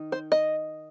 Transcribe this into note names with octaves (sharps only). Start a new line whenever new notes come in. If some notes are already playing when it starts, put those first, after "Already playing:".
Already playing: D#3 D#4
C5
D#5